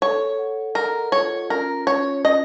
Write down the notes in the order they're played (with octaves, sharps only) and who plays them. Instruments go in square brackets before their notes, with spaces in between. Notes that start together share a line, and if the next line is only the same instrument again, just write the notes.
[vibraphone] A4 [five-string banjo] C#5
[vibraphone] F#5
[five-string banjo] A#4 [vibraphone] D#5
[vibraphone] F4 [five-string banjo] C#5
[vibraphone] C#4 [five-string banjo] A#4
[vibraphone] C#4 [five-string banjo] C#5
[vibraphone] C#4 [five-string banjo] D#5